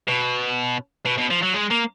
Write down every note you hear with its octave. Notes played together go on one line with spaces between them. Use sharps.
B2
B2
B2
F3
F#3
G#3
A#3